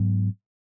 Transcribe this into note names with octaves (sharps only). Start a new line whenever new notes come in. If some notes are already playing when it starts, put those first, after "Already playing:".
Already playing: G#2 F#3 B3